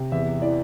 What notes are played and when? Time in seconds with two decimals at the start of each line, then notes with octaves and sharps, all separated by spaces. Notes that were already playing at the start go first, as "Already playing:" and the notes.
Already playing: C3
0.12 E2 E5
0.42 E3 D5